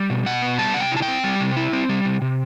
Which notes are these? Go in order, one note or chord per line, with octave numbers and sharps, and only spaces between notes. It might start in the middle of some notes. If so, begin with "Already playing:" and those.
Already playing: G3
B2
B2 F#5
B3
G3 A5
C3 F#5
G5
E4
A5
G5
C4
G3
C3
E4
C4
G3
C3
C3